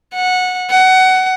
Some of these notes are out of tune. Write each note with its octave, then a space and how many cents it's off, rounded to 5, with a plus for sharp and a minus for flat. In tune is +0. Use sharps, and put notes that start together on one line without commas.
F#5 -15
F#5 +20